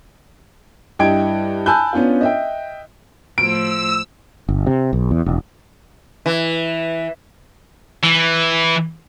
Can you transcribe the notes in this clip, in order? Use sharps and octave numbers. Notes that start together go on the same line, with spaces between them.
G2 E4 D#5 G5 G#6 D7
G#5 A5 B5 E6 F#6 G6
B3 C#4 D4 F4
D#5 E5 G5
A2 F3 E6 D7
G1
C3
B1
E2
E1
E3
E3